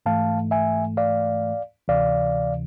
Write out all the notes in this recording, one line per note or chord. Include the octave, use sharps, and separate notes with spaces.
G#2 E3 A3 F5 A5
E5 G#5
D5 F5
D2 C3 E3 D5 F5